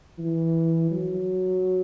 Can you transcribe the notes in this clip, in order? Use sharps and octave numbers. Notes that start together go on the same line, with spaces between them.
E3
F#3